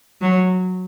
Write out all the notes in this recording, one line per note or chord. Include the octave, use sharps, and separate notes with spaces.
F#3